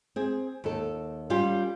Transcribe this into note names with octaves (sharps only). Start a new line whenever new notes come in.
C4 G#4
D#2 A4
G3 C#4 F4 G4